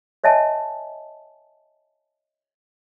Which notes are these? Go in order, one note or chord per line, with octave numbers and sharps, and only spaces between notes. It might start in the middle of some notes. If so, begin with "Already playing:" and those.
C#5 D#5 E5 G#5 A5